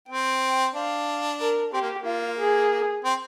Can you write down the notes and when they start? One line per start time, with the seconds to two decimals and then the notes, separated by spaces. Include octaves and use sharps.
0.09 C4 G5
0.75 D4 F5
1.40 A#4
1.73 C4 G4
1.81 A#3
1.98 A#3
2.06 F4
2.38 G#4
3.04 C4